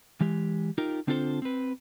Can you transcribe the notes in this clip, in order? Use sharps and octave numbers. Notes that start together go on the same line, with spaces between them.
E3 G#3 G4
D#4 F4 G4 A#4
D3 C4 D4 F4 A4 C5
C4 B4